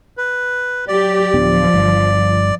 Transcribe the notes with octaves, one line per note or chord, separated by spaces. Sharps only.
B4
F#3 G4 D5
D1 F3 B3 D4
G1 G2